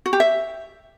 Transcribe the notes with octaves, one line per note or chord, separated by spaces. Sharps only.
F#4
G4
E5